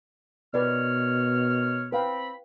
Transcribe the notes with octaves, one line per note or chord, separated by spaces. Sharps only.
B2 D#3 B4 C#5 D5 F6
C4 B4 F5 G5 B5